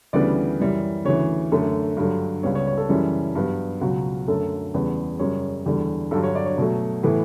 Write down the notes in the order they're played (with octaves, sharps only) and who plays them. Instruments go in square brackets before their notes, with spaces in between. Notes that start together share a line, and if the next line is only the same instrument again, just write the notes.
[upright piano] D2 C#3 E3 G3 B3 D5
F#2 E3 G3
D2 C#3 E3 C#5
F#2 D3 A3
G2 D3 F#3
C#2 C#3 G3 B3 C#5
C#5
C#5
A4
F#2 C#3 E3 G3
G2 F#3 B3
C#2 B2 F#3 F#4
F#2 D3 F#3 A3 A4
E2 C#3 G3 B3
F#2 C#3 G3 C#5
E2 D3 G3
G2 D3 F#3 A4
C#5
D5
C#5
B2 F#3 A3
A2 E3 B3